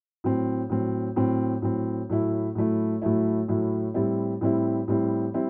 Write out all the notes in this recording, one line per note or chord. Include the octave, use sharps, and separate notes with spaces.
A2 F#3 C4
A2 F#3 C4
A2 F#3 C4
A2 F#3 C4
A2 F#3 A3 E4
A2 F#3 A3 E4
A2 F#3 A3 E4
A2 F#3 A3 E4
A2 G3 C4 E4
A2 G3 C4 E4
A2 G3 C4 E4
G3 C4 E4